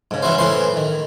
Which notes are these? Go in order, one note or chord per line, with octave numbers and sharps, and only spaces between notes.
G#2 C#3
E3 C#4 E4 F#4 C5
A2 E3 C#4 B4 C5 C6
D#3